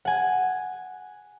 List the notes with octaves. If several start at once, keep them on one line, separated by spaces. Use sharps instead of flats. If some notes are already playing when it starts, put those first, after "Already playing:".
F#5 G#5